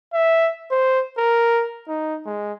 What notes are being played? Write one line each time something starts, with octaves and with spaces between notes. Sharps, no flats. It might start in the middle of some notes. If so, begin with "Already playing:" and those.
E5
C5
A#4
D#4
G#3